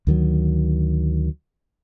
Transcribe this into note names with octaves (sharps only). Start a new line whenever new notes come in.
D2 D#3 F#3